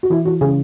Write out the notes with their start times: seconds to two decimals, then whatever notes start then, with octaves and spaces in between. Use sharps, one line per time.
0.03 F#4
0.10 E3 E4
0.25 E3 F#4
0.41 C#3 G#4